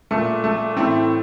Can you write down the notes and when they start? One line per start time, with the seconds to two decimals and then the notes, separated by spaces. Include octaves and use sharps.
0.11 A#2 A3
0.44 A3
0.76 A2 E3 A3 C4